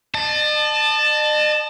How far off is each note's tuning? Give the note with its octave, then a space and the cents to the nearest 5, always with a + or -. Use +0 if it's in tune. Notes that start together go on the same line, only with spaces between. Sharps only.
D#5 -45 A5 +0